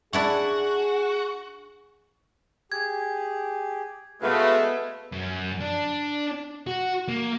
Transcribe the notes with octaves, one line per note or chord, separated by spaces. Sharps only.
D4 E4 F#4 G#4 F#5
G4 G#4 G#6
G#3 A3 B3 F#4 A4 B4 E5 F5
F#2
D4
F#4
A#3